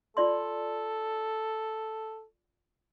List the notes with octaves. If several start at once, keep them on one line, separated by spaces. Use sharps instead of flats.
F4 A4 D5 C6